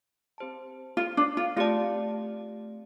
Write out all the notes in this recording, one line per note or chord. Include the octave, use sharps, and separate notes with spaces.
C4 G4 C5 A5
F4
D4
F4
A3 C4 F4 G4 D5 A5